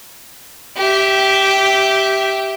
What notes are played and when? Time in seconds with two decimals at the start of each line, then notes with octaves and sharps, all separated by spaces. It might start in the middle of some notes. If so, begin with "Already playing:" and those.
0.77 G4 E5